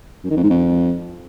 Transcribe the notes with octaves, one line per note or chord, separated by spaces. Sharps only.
F#2
D#3
F2
G#2
F2